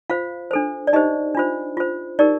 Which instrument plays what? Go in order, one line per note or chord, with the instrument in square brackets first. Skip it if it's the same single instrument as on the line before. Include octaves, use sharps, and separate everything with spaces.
[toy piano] F4 C5 F5
D4 A4 C5
D5
D#4 G4 C5 D#5
D4 F4 C5
F4 C5
D#4 G4 A#4 D5